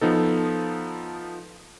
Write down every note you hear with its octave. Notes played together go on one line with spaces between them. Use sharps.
F3 B3 D#4 A4